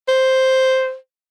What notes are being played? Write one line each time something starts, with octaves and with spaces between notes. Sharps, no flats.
C5